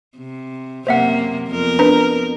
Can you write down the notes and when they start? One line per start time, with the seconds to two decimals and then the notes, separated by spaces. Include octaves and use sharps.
0.17 C3
0.87 F#2 C3 A#3 C5 E5 F#5
1.49 F2 B3 A#4
1.79 D4 B4 A#5